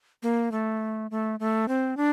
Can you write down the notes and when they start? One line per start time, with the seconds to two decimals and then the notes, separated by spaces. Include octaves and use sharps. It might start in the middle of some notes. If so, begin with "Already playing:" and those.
0.23 A#3
0.52 A3
1.11 A3
1.40 A3
1.68 C4
1.97 D4